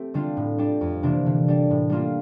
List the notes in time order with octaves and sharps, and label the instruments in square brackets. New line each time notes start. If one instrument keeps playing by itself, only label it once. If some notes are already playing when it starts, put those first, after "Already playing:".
Already playing: [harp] A3 C4 G4
D3 G3 D4 F4
A2
G3 D4 G4
F2
C3 E3 A#3 D4
D3
G3 D4
A2
G3 A#3 D4 F4